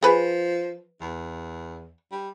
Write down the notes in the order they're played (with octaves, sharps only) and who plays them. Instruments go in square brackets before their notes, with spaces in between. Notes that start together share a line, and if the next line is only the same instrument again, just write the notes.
[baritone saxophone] F3 [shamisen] G#4 B4
[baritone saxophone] E2
G3